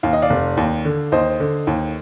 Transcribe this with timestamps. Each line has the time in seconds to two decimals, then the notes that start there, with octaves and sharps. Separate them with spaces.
0.03 D#2 F5
0.13 D#5
0.22 D5 F5
0.30 F1
0.57 D#2
0.85 D3
1.12 D#2 C5 D#5
1.40 D3
1.67 D#2